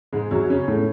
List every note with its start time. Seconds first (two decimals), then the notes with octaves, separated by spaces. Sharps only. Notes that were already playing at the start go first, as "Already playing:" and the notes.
0.13 G#2 G#3
0.31 F#2 F#3
0.50 C#3 C#4
0.68 A2 A3